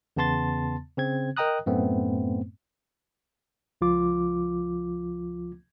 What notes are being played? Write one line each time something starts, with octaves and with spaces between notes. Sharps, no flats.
E2 C#3 B3 A5 C6 A6
C#3 C4 G#6
A#4 D#5 G5 A#5 D#6 F#6
F#2 A2 A3 B3 C4
C#2 F3 F4 D6